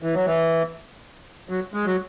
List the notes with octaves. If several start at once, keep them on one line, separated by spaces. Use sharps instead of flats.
E3
F#3
E3
F#3
G#3
F#3